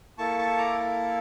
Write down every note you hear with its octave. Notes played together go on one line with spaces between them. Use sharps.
A#3 E4 A4 A5 C#6
A5 C#6
A#5 D6